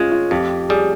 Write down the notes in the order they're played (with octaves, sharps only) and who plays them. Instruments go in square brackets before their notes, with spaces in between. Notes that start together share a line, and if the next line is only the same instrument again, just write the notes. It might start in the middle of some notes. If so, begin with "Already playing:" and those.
Already playing: [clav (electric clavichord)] G#3 [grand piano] C#4 F4
[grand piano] F4
[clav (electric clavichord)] F2 [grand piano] G4
[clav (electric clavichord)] G3 [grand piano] G#4